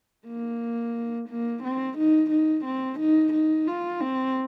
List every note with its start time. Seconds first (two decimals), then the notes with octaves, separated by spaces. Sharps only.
0.27 A#3
1.29 A#3
1.63 C4
1.98 D#4
2.31 D#4
2.65 C4
3.00 D#4
3.34 D#4
3.67 F4
4.01 C4